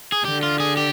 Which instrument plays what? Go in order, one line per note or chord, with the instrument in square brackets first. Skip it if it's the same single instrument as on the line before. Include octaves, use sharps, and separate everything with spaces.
[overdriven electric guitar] G#4
[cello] D3 [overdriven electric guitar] G4
[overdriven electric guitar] F4
G#4
G4